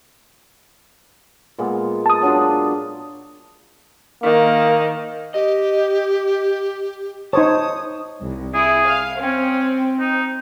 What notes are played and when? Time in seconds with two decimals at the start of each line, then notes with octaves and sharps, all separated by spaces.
1.58 A#2 G#3 B3
2.06 A5 D#6
2.22 F#3 D4 F4
4.23 D#3 A#3
5.34 G4 D#5
7.33 D#4 C5 C#5 A5 D#6
8.20 C2
8.54 E4 G#4
8.86 F5
9.20 C4 C#4
9.99 D#4